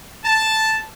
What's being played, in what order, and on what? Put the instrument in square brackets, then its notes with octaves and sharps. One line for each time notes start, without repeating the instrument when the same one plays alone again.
[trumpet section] A5